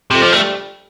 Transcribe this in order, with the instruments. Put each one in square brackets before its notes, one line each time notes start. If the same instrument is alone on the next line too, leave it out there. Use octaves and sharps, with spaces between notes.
[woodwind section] F2 [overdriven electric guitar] C3
[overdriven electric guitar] F3
[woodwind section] D3 G3 [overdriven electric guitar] A3